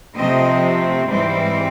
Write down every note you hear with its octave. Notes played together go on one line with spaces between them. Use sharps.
C3 F3 A3 C4 D#5
G#2 E3 G3 C4